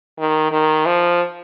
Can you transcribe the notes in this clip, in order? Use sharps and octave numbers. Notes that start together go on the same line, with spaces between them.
D#3
D#3
F3